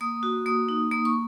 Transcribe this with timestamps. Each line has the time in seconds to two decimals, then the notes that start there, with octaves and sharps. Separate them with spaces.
0.01 A#3 D#6
0.23 F#4
0.46 A#3 D#6
0.69 D#4
0.91 A#3 D#6
1.05 C#6